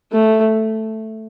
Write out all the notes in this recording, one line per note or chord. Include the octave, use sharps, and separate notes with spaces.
A3